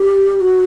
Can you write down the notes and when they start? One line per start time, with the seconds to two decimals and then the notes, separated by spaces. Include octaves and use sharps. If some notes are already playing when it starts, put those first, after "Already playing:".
Already playing: G4
0.37 G4
0.41 F#4